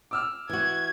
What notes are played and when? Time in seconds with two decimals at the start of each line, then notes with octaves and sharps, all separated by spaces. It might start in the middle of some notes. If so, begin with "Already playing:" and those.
0.11 D6 E6 F6
0.49 E3 F#4 G#6